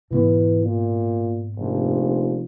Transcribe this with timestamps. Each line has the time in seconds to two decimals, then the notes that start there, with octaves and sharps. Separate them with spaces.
0.11 G#2 B2 E3 B3
0.64 A#2
1.57 F1 A#1